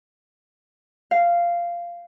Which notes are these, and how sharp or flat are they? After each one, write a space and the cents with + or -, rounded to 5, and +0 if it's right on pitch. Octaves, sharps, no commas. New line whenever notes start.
F5 -10